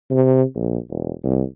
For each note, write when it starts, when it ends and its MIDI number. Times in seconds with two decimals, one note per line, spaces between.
0.11 0.43 48
0.55 0.78 34
0.89 1.12 28
1.24 1.43 36